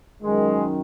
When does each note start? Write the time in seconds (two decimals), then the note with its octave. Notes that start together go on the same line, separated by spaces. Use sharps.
0.22 F#2 D#3 G#3